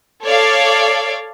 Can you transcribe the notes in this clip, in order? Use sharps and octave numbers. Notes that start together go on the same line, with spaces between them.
A4 C#5 D5 F5